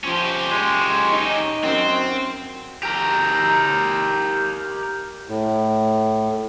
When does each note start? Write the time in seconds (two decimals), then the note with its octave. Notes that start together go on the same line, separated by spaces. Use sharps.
0.05 F3 C#4 G4
0.51 G#3
1.12 D#4
1.64 F#2 C4
2.83 G4 A#4
5.28 A2